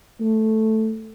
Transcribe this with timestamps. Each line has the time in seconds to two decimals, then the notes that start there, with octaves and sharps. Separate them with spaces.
0.20 A3